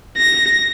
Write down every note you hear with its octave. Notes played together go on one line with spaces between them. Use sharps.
A#6